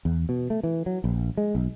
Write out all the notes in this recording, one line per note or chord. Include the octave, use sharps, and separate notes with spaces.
E2
B2
A3
E3
F#3
A#1
G#3
B1